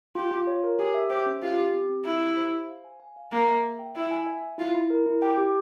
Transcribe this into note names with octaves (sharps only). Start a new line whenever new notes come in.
F4 G4
F4
C#5
A#4
G4 G#4
E5
G4 C5
C#4
F4 G4
G4
C4
C4
E4 E5
G4
C5
C5
F5
G#5
G#5
F5
A#3 G#4
E5
E5
G5
E4 E5
G#5
E5
E5
E4 F4
E4
A#4
E4
G4 G5
G4